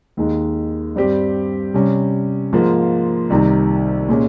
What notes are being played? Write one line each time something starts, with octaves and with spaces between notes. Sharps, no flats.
D#2 D#3 G#3
G2 G3 C4 G4
C3 G3 C#4
G#2 F3 A#3 F4
C2 C3 D#3
A#2 G#3 C#4